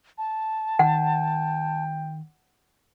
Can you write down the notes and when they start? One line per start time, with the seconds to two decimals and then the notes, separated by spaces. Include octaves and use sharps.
0.18 A5
0.79 D#3 F#5 G5